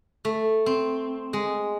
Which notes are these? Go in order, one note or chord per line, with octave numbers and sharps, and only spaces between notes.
A3
C4
G#3